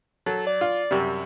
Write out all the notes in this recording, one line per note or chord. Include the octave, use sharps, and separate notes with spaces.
F#3 A4
D5
F4
F#2 C3 G3